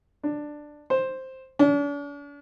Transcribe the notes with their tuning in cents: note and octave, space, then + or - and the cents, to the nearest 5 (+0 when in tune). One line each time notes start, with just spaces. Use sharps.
D4 +10
C5 +5
D4 -45